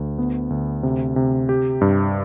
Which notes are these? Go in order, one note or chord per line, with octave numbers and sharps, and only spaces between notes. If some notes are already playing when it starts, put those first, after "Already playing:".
Already playing: D2
B3
D2
C3
C3
G4
G2